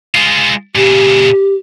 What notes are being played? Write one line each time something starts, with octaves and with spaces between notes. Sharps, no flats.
G#3 F4
A#2 C#3 G4